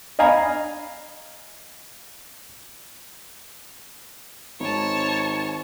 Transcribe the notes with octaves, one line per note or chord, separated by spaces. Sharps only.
D#5 F5 G#5 A#5 B5
G#1 C#5 A5